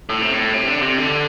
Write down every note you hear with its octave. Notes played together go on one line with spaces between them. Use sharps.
A2
C3
A2
C3
D3
C3
D3